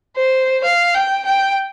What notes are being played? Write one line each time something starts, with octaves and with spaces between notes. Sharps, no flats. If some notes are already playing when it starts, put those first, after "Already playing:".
C5
F5
G5
G5